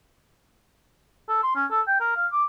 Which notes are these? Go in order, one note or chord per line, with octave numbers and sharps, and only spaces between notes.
A4
C6
C#4
A4
G5
A#4
F5
D6